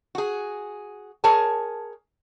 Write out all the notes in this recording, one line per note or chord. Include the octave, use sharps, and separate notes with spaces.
F#4 G#4
G#4 A#4 C#5 G#5 A5